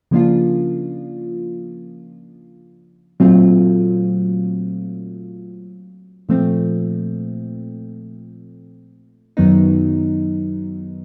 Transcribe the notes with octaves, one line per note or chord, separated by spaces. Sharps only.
C#3 F3 A#3 D4 F4
A#2 F#3 A3 C4 F4
A#2 F3 A3 C4
F#2 D#3 F#3 B3 D#4